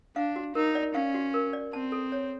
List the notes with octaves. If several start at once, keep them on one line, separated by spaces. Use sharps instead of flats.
D4 F5
F#4
D#4 A#4
D5
C#4 F5
F#4
A#4
D5
C4 A5
A4
C#5